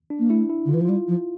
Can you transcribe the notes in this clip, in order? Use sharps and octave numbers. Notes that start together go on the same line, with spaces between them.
D4
A#3
A3 E4
E4
D3
F4
E3
E4
F3
G3 F4
F3